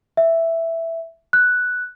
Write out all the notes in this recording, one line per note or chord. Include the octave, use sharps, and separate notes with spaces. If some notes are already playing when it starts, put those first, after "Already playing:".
E5
F#6